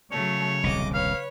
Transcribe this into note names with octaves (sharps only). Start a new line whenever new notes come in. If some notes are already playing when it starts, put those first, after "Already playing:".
C#3 F#3 A3 C#5
D#1 C2 D#5 D6
B4 C#5 F5